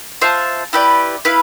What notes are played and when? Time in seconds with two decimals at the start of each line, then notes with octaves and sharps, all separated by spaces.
0.21 F4 C5 E5 A5
0.73 E4 G4 B4 D5
1.25 E4 B4 F5